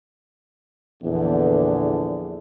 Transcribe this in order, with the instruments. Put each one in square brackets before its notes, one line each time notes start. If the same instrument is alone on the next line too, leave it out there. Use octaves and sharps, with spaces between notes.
[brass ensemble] A#1 E2 D3